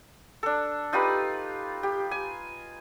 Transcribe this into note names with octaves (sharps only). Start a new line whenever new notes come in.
D4 A4
D#4 F4 G4 B4
G4
G#5